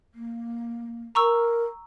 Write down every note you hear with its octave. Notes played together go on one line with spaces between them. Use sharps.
A#3
A#4 A#5 C#6 E6